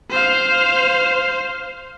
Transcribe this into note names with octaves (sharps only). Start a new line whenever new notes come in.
C5 F5